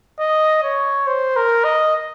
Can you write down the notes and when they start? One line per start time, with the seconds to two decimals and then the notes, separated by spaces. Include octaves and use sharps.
0.20 D#5
0.63 C#5
1.06 C5
1.36 A#4
1.64 D#5